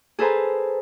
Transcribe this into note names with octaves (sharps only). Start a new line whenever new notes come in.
G#4 A4 B4 C5 G#5 A#5